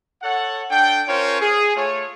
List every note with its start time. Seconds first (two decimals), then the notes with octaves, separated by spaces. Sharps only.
0.22 A4 C#5 F#5
0.71 D4 A4 G5
1.08 C#4 F4 A#4 C5 C#5
1.41 G#4
1.76 A3 F4 C#5